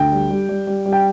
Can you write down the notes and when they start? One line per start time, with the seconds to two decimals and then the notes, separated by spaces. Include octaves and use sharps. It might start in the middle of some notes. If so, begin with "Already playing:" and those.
Already playing: D2 G5
0.12 G3
0.30 G3
0.49 G3
0.67 G3
0.86 G3
0.93 G5